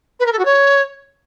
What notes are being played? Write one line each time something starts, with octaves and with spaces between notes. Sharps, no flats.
B4
A#4
A4
F#4
C#5